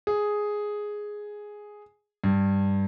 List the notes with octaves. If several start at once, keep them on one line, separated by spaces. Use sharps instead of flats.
G#4
G2